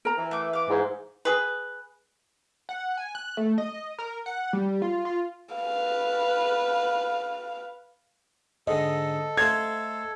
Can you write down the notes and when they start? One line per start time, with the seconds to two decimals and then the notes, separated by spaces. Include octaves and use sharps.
0.05 A#4 A#5
0.17 E3
0.31 A3 D6
0.53 F5 D6
0.70 G#2 E3
1.25 G#4 B4
2.69 F#5
2.97 G#5
3.15 F#6
3.37 A3
3.58 D#5
3.99 A#4
4.26 F#5
4.53 G3
4.82 F4
5.05 F4
5.56 B4 F5
8.67 G#2 D3 A4 D#5
9.37 A3 C5 F5 G#6